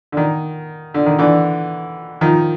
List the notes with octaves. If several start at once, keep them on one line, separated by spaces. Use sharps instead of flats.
D3
D#3
D3
D#3
D3 E3
D#3 F3